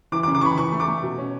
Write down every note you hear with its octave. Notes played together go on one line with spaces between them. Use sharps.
E3 D6
D6
C#3
D6
E3 B5 C#6
E3 C#6
A3
D6
A3
B2
C#4